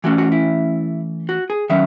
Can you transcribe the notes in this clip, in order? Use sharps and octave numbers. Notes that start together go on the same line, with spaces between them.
E3 A3 C#4 F#4
F#4
E4
F#4
G#4
D#3 F#3 C#4 E5